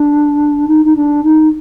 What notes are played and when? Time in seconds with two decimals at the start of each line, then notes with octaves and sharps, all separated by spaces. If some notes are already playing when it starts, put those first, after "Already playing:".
Already playing: D4
0.68 D#4
0.85 D#4
0.96 D4
1.24 D#4